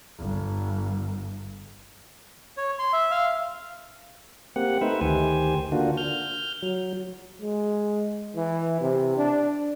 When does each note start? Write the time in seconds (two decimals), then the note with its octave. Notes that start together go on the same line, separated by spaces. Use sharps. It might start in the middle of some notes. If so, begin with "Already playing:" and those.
0.18 G1
2.57 C#5
2.79 C6
2.93 E5
3.11 F5
4.56 A#3 C4 G4 F#5
4.81 A3 D#4 B4 C5 E5
5.01 D2 D#3 G4 C5 G#5
5.72 D3 A#3 D4 F4 F#4
5.97 F6 G6
6.62 F#3
7.42 G#3
8.36 E3
8.81 C3
9.17 D4